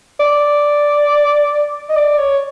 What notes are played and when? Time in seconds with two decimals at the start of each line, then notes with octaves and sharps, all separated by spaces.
0.20 D5
1.90 D#5
1.96 D5
2.18 C#5